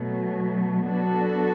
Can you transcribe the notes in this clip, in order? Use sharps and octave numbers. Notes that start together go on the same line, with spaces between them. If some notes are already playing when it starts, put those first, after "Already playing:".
Already playing: B2 F#3 A3
F#3 B3 D4 F#4 A4